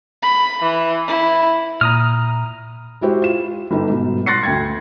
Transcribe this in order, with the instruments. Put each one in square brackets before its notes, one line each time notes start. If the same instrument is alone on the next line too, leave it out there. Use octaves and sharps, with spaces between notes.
[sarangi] B5
E3
E4
[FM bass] A#2 [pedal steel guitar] A#5 D#6 F6
[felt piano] G#3 E4 F#4 G4 C5
F4 E7
G1 G3 D#4
G#2 B2
C6 F#6 A6 A#6 C7 C#7
D2 G5 G#6